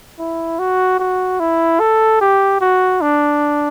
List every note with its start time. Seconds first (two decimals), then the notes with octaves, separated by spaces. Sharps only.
0.19 E4
0.59 F#4
0.99 F#4
1.40 E4
1.80 A4
2.21 G4
2.61 F#4
3.01 D4